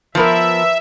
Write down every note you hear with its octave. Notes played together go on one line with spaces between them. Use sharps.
F3 B3 A#4 E5